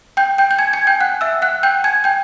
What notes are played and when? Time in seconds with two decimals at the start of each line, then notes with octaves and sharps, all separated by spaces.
0.17 G5 G6
0.38 G5 G6
0.51 G6
0.59 G#5 G#6
0.73 G#5 G#6
0.87 G5 G6
1.00 F#5 F#6
1.21 E5 E6
1.42 F#5 F#6
1.63 G5 G6
1.84 G#5 G#6
2.04 G5 G6